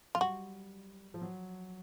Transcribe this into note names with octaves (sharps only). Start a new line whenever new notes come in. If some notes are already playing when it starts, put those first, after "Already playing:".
F#3 F4
G3 F#4
F3
F#3